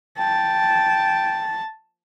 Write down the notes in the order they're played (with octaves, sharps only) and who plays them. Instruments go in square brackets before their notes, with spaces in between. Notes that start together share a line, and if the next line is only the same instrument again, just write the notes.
[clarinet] G5 [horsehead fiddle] A5